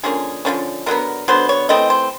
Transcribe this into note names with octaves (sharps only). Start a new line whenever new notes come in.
D3 F3 A#3 C#4 G#4
D3 F3 A#3 C#4
D3 F#3 B3 A#4
D3 F#3 B3 C5
C#5
E3 A3 C4 D#5
C5